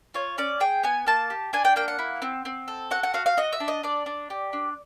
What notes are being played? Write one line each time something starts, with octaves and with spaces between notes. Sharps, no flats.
F4 C#5
C#4 D5
G#4 G5
B3 G#5
A#3 A5
G4
D4 G#5
G5
A#3 G5
F#5
E4
C4
C4
A4
F#4 F#5
F#5
F#4 F5
F5
F#4 D#5
E5
D4
D#5
D4 D5
D4
G4
D4